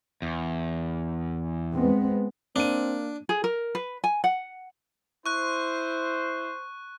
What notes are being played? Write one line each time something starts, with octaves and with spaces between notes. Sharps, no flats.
E2
G#3 B3 C4
A#3 C4 D4 D#7
G#4
A#4
B4
G#5
F#5
E4 C5 C#6 F#6